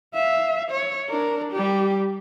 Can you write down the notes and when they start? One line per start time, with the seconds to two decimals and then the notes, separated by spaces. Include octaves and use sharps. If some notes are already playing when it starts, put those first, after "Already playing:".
0.14 E5 F5
0.71 C#5
1.10 D4 A#4
1.52 G3 G4